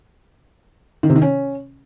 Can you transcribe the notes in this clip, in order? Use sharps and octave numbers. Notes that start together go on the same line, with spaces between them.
D#3
C3
D#3
C#4